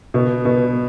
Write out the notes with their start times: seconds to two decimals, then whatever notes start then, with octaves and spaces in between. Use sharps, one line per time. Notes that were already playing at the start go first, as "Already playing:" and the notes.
0.14 B2
0.45 B2